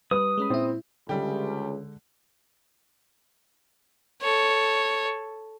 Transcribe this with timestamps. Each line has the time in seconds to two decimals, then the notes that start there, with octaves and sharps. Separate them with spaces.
0.11 G3 B4 D#6
0.38 G#3 C#4 B5
0.50 A#2 C4 E4
1.09 C#2 D3 G3 G#3 G4
4.22 A4 C#5